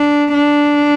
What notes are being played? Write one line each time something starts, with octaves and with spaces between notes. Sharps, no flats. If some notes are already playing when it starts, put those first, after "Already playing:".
Already playing: D4
D4